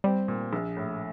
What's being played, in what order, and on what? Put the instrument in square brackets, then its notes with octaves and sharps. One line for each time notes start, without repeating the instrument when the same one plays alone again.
[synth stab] G3 [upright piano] C4
[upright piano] A#2
A#1
A2